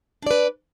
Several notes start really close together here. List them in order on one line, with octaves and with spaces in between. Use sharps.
D4 D5 B4